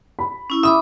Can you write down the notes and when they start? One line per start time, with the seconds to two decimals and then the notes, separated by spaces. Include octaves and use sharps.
0.19 B5
0.50 C#4 E4 E6
0.63 E5 B5 D6 D#6